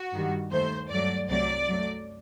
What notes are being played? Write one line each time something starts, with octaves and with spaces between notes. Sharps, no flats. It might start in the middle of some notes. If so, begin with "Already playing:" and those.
Already playing: F#4
G2 D#3 G3
D#2 D#3 A3 C5
G2 F#3 A3 D5
C2 C3 F#3 A3 D5
F#2 F#3 A3